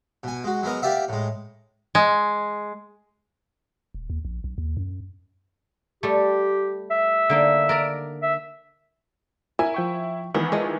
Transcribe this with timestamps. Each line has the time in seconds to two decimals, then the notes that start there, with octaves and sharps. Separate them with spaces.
0.23 B2 G#5
0.44 G#3 F#4
0.63 F#3 G#3 B3 A#4 D#5
0.82 A#3 G4 D5 E5 F#5
1.09 A2 G#3
1.95 G#3
3.94 D#1
4.10 D#2
4.25 A#1
4.44 B1
4.58 D#2
4.77 F#2
6.03 G3 A3 G4
6.91 E5
7.29 D3 A#3 D#4
7.69 A#4 D5 A#5
8.23 E5
9.59 E4 A#4 G#5
9.74 F3 G5 C#6
10.34 D#3 E3 B3 B5
10.52 F3 G#3 F4 D#5